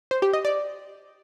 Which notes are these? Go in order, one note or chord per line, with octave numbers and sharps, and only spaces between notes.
C5
G4
D#5
D5